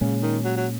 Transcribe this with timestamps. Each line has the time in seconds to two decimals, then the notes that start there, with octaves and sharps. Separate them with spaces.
0.01 A#2 C#3 G#3 C#4
0.22 D#3
0.45 F#3
0.57 F#3